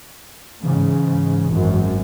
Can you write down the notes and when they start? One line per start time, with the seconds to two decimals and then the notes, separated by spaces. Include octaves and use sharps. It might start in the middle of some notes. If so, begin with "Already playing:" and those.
0.63 G#2 C#3 E3
1.48 G#1 F#2